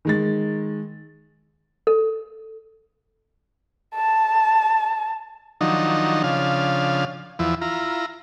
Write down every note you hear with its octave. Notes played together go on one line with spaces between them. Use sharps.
D#3 G#3 A6
A4
A5
D#3 F3 F#3 D4 D#4
C#3 F3 D4 F5
E2 F3 E4
E4 F4 A#5